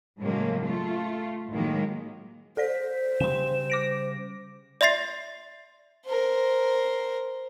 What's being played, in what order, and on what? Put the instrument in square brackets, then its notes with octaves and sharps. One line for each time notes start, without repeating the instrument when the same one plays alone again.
[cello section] A2 C#3 F#3 G#3 A#3
A3 F4
A2 D#3 F#3 G#3 A#3
[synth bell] A4 D5 B6 [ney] C5
[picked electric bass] C#3 G3 [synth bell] C6 E7
[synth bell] D6 A#6 D7
[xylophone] D5 E5 C6 A6 C7
[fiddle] A#4 C5